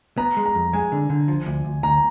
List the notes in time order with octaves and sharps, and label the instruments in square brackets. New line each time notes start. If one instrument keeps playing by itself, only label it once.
[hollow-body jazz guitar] B3 [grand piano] A#5
[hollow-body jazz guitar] G#3
[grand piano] A#5
[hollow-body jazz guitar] F2
[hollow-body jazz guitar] G#3 [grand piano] G#5
[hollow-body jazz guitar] D3
D3
F3
D2
D2
[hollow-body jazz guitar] D2 [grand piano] A#5